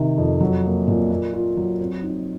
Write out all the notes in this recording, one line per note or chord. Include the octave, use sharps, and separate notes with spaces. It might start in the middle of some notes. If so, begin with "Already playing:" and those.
Already playing: C3 D#3
F2
F#3
A#3
A#2
A#3
F4
F#3
C4
D#4